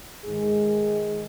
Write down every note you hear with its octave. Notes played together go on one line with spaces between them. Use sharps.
G#2 D#3 G#3 G#4